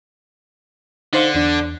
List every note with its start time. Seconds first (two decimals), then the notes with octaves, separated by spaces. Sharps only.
1.13 D3 D#4 C5 F5
1.35 E2 D4